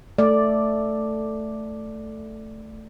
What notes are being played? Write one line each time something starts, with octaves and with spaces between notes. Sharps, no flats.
A3 D5